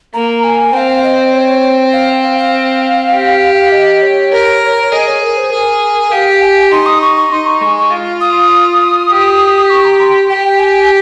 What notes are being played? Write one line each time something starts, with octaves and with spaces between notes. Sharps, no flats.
A#3 A#5
G#5
C4 F5 G5
D#5
C#5
F5
F5
F5
G4
D#5
C#5
A#4
G#4 D#5
C#5
A#4
C5
G#4 A#4
G4 F5
G#5
D#4 C6
D#6
C#6
C#6
D#4 C6
C#6
G#3 C#6
C#6
F4
D#6
G4
C#6
A#5
C6
G4 G5
G#5